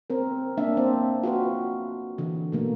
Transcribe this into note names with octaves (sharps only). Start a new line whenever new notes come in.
C4 A#4
A#3 D4 E5
C4
F4 F#4 B4
D3 E3
B2 A3 A#3